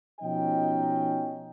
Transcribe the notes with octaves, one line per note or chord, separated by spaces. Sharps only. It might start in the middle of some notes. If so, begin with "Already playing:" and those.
B2 F3 C#4 D#4 D#5 G5